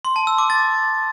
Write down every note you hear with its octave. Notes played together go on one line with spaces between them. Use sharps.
C6
A5
E6
D6
A6